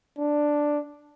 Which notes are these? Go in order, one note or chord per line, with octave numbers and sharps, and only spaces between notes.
D4